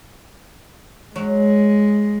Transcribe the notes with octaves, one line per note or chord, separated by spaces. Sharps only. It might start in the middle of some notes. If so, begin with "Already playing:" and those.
F#3 G#3